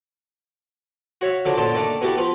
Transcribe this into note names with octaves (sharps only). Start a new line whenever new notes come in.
F#4 C#5 E5 F5
D3 F3 F#3 D4
F#2 A#2 D3 A5 C6
D#3 A3 A#3 D4
B3 E4 F#4 G4 A4
F3 B3 F4